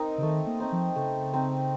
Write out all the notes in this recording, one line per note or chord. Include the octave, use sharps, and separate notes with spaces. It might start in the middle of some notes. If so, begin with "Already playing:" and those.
Already playing: C4 D#4 A#4 D#5
C#3
D#3 A3
A#3
C4 D#4
F3
C#3 A3
C4 D#4